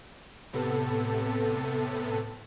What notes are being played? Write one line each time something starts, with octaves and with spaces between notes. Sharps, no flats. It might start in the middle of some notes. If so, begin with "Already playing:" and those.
A2 C3 B3 A4